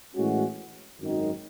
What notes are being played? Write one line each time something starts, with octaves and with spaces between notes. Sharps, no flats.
A2 E3 G#3 C#4 F#4
G#1 F#2 D#3